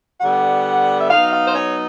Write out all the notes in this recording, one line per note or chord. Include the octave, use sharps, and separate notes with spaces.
D3 G3 B3 F#5
E5
F#3 B3 D#4 F5
F5
C5
C#5